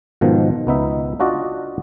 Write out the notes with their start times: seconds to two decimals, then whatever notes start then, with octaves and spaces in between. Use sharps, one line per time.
0.21 G#2 B2 D#3 F3
0.67 C#2 B3 D#4 E5
1.20 D4 F4 F#4 D5 D#5